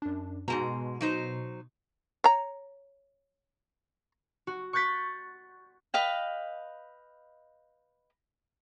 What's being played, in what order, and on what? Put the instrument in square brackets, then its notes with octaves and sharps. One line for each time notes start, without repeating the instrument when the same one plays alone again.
[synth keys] F#2 D4
[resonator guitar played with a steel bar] G#2 G#3 A#5 [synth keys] B2
[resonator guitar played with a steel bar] F#3 D#4 C5
[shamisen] C#5 A#5
[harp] F#4
C#6 F#6 G6 A6 B6
[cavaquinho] B4 D#5 F5 G5